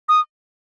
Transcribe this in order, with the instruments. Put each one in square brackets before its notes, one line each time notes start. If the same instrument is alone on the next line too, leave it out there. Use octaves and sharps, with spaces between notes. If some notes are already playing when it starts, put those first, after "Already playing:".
[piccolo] D#6